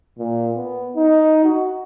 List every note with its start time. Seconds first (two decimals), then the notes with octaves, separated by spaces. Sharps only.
0.18 A#2
0.56 B3
0.96 D#4
1.45 F#4